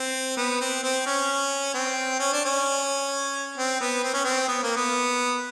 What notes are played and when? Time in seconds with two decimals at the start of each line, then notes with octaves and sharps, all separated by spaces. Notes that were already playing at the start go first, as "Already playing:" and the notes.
Already playing: C4
0.37 B3
0.61 C4
0.83 C4
1.06 C#4
1.74 C4
2.20 C#4
2.33 D4
2.45 C#4
3.58 C4
3.81 B3
4.04 C4
4.13 C#4
4.24 C4
4.48 B3
4.63 A#3
4.76 B3